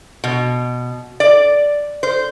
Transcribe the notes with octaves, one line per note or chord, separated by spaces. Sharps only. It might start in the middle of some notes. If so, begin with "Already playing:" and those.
B2
D5
C5